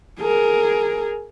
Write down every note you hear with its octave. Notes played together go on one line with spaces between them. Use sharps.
G#4 A#4